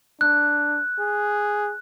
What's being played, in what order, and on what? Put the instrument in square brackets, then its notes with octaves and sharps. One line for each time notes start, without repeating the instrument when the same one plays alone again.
[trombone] D4 [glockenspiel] F#6
[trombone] G#4